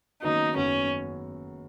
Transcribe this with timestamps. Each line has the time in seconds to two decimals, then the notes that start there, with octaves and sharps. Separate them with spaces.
0.22 F#1 F#2 D#3 B3 D#4 F#4
0.56 F#1 F#2 D#3 B3 C#4 F#4